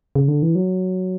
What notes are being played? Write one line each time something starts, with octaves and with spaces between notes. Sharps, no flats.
C#3
D3
E3
F#3